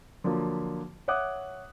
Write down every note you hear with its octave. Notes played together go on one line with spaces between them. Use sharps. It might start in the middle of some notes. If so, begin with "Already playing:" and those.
D3 F3 F#3 A#3
C#5 E5 F#5 D6 D#6 F#6